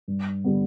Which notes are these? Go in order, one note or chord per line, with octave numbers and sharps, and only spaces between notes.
G2
D3 G3 B3